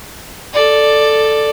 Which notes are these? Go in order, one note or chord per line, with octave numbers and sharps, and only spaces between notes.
A4 D5